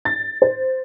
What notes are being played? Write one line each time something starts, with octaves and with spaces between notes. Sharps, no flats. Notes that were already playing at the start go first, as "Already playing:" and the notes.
A6
C5